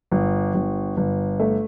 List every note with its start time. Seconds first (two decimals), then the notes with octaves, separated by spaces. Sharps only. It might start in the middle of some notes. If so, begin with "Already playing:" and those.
0.12 G1
0.54 G1
0.97 G1
1.40 A3